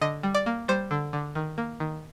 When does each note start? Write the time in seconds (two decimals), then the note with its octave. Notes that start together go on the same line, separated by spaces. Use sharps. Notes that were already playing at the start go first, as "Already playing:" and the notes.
0.01 D3 D#5
0.23 G3
0.35 D5
0.46 A#3
0.68 G3 C5
0.91 D3
1.13 D3
1.35 D#3
1.58 A#3
1.80 D#3